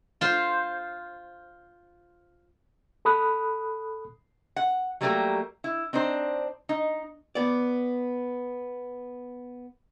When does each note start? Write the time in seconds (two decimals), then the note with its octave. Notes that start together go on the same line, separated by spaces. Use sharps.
0.21 F4 C5
3.05 A4 B5 D#6 F#6
4.56 F#5
5.01 F#3 G3 A3 A#3 G4 A#4
5.64 E4
5.93 C4 D4 D#4 C5
6.69 D#4
7.35 B3 D5